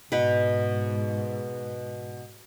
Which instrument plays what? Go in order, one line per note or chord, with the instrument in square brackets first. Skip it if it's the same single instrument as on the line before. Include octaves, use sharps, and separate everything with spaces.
[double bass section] G#2 [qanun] B2 B4